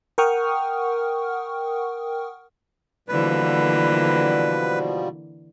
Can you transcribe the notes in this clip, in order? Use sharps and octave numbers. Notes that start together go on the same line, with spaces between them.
A#4 F#5 G5 C#6 D#6 F6
B2 D3 E3 F3 G3 A#3 B4